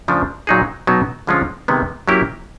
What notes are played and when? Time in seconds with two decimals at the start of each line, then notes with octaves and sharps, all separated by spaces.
0.08 C#3 F3 A3 D4
0.47 A#2 F#3 A#3 D#4 G#4
0.87 B2 F#3 B3 D#4
1.27 D3 F3 G#3 C#4 F4
1.68 C3 D#3 G#3 B3
2.08 F#3 A#3 C#4 E4 G4